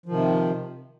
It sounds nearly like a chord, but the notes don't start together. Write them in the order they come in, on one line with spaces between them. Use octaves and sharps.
F3 D#3 C3